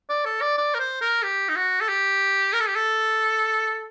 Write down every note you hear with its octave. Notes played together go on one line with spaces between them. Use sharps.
D5
A4
D5
D5
A#4
C5
A#4
G4
D#4
F#4
A4
G4
A#4
A4
G4
A4